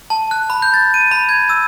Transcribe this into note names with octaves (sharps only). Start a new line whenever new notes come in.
A5
F#6
B5
G6
A6
D#7
B5
G#6
E6